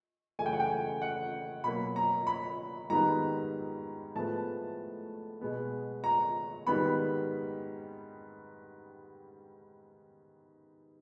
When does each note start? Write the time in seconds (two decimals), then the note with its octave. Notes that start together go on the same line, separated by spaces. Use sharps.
0.39 F#2 C#3 E3 A3 G#5
0.46 G5
0.53 F#5
0.60 G5
0.70 G#5
1.02 F#5
1.64 B2 F#3 A#3 B5
1.96 A#5
2.27 B5
2.90 G#2 D#3 G3 B3 A#5
4.15 A2 F3 G#3 B3 A5
5.41 B2 G#3 B3
6.04 A#5
6.67 G#2 D#3 G3 B3 B5